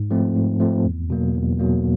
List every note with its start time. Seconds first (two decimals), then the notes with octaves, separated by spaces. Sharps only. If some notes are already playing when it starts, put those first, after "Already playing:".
Already playing: G#2
0.11 F3 A3 C4
0.36 G#2
0.60 F3 A3 C4
0.85 E2
1.10 B2 F#3 A#3
1.35 E2
1.59 B2 F#3 A#3